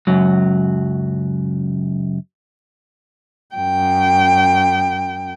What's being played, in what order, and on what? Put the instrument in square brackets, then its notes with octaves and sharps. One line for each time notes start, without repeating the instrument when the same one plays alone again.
[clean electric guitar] C#2 F#2 F#3
[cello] F#2 G5